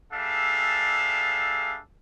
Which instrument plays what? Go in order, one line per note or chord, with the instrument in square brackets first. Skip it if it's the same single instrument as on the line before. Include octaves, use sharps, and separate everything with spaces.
[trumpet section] G3 D4 G#4 A4 E5 F5